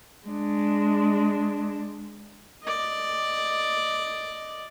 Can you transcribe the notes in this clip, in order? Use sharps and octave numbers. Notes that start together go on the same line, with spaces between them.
G#3 D4
D5 D#5